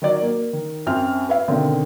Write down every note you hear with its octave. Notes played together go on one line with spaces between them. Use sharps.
D#3 F#3 D5
A#3
D#3
F#2 C4 E5 F6
B4 E5 F5
B2 D3 D#3 C4